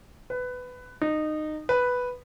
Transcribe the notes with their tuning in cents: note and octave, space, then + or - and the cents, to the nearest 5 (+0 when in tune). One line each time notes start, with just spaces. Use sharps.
B4 +15
D#4 -20
B4 +0